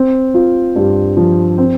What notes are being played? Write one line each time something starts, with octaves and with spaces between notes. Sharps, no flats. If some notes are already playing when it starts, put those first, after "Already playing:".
Already playing: C4
F4
G2
F3
C4